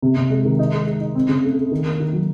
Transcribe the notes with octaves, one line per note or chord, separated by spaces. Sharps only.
C3
C3
G#3
D#3
D#4
G#3
D#4
D#4
C4
C#3
A3
A3
D#3
A#3
D#3
F#3